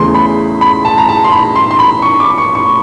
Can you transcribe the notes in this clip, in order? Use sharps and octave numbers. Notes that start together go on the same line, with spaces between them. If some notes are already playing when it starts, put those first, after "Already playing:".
Already playing: E2 C#3 E3 A3 C6
B5
B5
A5
A#5
A5
C6
B5
C6
C6
B5
C#6
D6
C#6
C#6